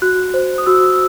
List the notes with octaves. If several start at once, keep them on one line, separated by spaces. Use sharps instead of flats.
F#4 F#6
C5
D#6
F#4 E6